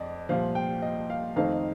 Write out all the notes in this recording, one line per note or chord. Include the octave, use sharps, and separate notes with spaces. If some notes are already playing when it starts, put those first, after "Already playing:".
Already playing: F2 D5 D#5
C2 A#2 F3 F5
G5
D#5
F5
F2 D#3 A3 C4 D#4 F5
D#5